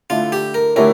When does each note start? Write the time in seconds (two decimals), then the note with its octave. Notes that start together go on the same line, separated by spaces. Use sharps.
0.10 D3 A3 E4 F4
0.32 G4
0.54 A#4
0.76 D3 A3 E4 G4 A#4 C#5